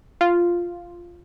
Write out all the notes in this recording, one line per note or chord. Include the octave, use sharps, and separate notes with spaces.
F4